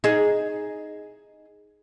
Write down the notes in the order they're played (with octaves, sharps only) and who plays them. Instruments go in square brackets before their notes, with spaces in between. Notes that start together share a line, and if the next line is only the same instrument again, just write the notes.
[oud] D#4 G#4